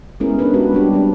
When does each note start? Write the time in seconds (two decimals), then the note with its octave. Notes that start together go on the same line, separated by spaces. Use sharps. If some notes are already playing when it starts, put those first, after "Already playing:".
0.20 G#3 B3 C#4 E4 G#4 A#4
0.39 G#3 B3 D4 D#4 B4
0.53 C#4 F#4 G4 B4
0.73 G3 D4 G4
0.93 G3 C4 D4